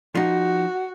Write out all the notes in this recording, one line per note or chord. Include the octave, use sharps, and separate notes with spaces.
F3 D#4 F#4